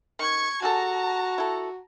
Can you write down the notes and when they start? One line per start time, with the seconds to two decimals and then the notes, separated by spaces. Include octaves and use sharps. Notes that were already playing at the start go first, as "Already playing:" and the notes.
0.19 D#3 C#6 G#6
0.62 G3 F#4 G#4 A4 A5 A#5
1.38 E4 A4